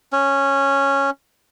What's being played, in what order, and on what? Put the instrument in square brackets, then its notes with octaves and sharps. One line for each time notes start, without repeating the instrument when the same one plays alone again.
[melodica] C#4